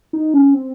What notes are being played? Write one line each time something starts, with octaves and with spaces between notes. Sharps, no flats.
D#4
C#4
C4